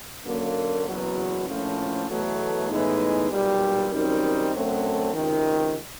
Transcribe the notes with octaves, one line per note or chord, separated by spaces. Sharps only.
F#2 D3 F#3 A#3
F#1 E2 B2 F#3
A#1 A2 F3 A3 C#4
E2 B2 F#3 A3
A2 E3 G#3 B3 D#4
B1 A#2 G3
F#2 D#3 G3 C4 D#4
F#2 D3 F#3 A3 C4
C#2 C3 D#3